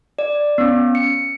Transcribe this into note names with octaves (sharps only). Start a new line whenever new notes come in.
D5
B3 C#4
C#7